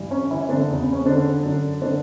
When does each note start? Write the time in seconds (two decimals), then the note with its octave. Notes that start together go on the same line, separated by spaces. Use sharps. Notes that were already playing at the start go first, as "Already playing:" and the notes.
Already playing: G2 E3
0.11 C#4
0.31 E3 E4
0.49 D3 D4
0.68 E2 C#3 E3
0.81 B3
0.93 C#4
1.05 D3 D4
1.43 F#2 D3
1.82 D3 D4